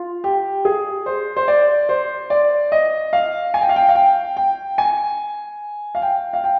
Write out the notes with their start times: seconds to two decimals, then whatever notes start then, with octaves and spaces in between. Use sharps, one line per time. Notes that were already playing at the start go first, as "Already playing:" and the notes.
Already playing: F4
0.24 G4
0.65 G#4
1.06 C5
1.37 C5
1.48 D5
1.89 C5
2.30 D5
2.72 D#5
3.13 F5
3.54 G#5
3.62 G5
3.69 F5
3.76 G5
3.89 F5
3.95 G5
4.37 G5
4.78 G#5
5.95 F5
6.02 G5
6.33 F5
6.44 G5